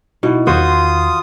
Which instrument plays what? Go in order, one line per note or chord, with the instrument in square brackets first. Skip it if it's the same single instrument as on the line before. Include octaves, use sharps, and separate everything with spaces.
[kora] B2 [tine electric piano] D#4 E4
[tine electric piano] E2 D#3 [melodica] F4 D#6 [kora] F#4 C5